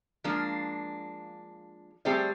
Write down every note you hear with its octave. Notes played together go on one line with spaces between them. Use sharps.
F3 G#3 A#3 D4
G3 A3 C4 G#4 C5 D5